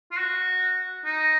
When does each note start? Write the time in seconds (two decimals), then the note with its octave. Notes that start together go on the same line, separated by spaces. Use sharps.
0.12 F4
0.18 F#4
1.05 D#4